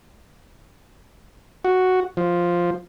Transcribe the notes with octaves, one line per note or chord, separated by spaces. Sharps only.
F#4
F3